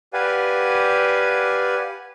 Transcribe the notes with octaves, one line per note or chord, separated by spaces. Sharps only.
G4 B4 D5 F5 F#5 G#5